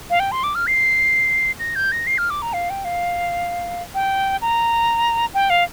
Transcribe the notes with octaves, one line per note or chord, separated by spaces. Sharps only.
F5
G5
C6
D6
F6
C7
A#6
G6
A#6
C7
F6
D6
A#5
F5
G5
F5
G5
A#5
G5
F5